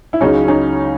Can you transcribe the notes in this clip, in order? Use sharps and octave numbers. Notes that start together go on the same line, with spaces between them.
E4
C#2 C#3 F#3 C#4 D#4
C#4 D#4